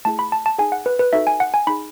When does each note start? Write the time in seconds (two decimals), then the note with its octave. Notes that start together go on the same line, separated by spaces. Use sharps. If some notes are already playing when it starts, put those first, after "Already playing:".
0.05 A3 E4 G#4 A5
0.19 B5
0.32 A5
0.46 A5
0.58 D#4 G#4 G#5
0.72 F#5
0.86 B4
0.99 B4
1.13 D#4 F#4 A4 E5
1.27 G#5
1.40 F#5
1.54 G#5
1.67 D#4 G#4 B5